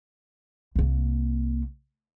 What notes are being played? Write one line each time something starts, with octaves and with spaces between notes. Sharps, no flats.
C2 A#3